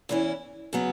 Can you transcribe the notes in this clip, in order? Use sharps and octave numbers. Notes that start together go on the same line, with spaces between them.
E2 E3 C#4 E4
C#3 F#3 B3